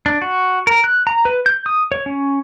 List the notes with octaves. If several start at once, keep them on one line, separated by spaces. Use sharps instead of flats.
D4
F#4
A#4
F#6
A#5
B4
G6
D#6
C#5
C#4